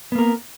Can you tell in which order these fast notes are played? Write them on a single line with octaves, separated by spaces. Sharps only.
B3 A#3 A#4